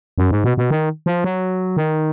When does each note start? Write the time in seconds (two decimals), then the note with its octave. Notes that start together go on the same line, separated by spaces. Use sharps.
0.18 F#2
0.31 G#2
0.44 B2
0.57 B2
0.71 D#3
1.06 F3
1.24 F#3
1.77 D#3